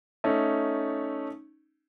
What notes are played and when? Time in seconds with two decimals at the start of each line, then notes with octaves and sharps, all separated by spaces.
0.24 A3 C#4 D#4